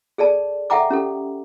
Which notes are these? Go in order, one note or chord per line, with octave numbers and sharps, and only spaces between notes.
G#4 A4 D5 A5
A4 E5 F#5 G5 A#5 D6
C#4 G4 A4